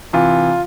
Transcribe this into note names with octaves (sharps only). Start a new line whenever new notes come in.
C3 E3 F4